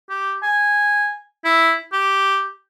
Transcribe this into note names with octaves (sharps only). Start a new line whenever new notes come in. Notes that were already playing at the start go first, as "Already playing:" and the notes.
G4
G#5
E4
G4